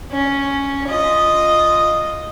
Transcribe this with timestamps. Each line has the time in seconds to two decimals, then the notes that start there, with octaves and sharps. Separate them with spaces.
0.11 C#4
0.88 F4 D#5